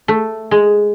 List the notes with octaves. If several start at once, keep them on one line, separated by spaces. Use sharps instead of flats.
A3
G#3